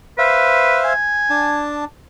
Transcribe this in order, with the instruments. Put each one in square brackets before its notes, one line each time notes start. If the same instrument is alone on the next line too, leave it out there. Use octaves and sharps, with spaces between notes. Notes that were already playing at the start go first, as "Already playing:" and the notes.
[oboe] B4 [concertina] C5 E5 F5
[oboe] G#5
[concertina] D4 A5